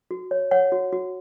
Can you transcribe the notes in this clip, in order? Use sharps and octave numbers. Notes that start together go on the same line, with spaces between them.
F#4
C#5
C#5 F#5
F#4
F#4